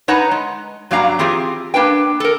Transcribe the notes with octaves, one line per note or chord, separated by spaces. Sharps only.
D#4 B4 C#5 F#5 A5 A#5
G#3
G2 F#3 A#3 D4 F5 A#5
E3 C4 F4 G4 G#4
A#3 D4 B4 G5
A4 A#4